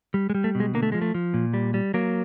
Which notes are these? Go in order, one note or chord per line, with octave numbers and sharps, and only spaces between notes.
G3
G#3
G3
A3
B2
G#3
D3 A#3
A3
F3 G#3
A3
F3
A#2
G3
G3
F#3 A#3